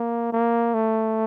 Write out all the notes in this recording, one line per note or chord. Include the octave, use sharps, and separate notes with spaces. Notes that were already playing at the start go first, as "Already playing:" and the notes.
Already playing: A#3
A#3
A3